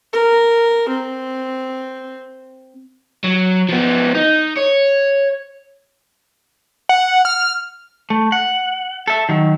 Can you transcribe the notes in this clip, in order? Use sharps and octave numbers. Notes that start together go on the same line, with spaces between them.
A#4
C4
F#3
F3 B3
D#4
C#5
F#5
F6
A3
F#5
A4 E5
D#3 F#3